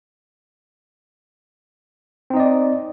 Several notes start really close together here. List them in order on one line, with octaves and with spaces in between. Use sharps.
C4 D#4 D#5 D5